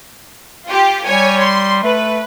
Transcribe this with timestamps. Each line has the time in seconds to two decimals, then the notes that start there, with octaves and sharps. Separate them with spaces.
0.67 F4 G4
1.06 G3 C#5 G#5
1.41 C6
1.83 A3 B4